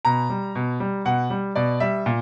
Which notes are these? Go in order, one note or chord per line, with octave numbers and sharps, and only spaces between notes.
B2 A#5
G3
B2
G3
B2 F#5
G3
B2 D5
G3 E5
A#2